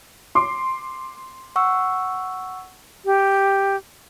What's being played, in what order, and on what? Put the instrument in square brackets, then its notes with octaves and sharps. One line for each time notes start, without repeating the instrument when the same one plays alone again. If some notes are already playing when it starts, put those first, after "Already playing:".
[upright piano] C6 D6
[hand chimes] F#5 C#6 E6
[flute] G4